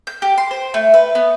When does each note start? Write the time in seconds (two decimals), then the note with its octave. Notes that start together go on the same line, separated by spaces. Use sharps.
0.07 G6
0.22 G4
0.38 C6
0.51 C5
0.74 A3
0.94 B4
1.15 B3